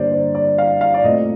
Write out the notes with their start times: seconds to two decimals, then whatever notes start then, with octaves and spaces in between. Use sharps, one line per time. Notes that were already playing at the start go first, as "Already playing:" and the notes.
Already playing: G2 D3 G3 A#3 C5 D5
0.11 C5
0.35 D5
0.58 F5
0.81 F5
0.94 D5
1.03 A#2 A3 C4 D#5